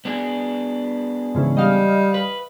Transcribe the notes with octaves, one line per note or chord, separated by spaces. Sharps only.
B3 D4 G#4
G#2 C#3 E3
G3 D#5 F5
B4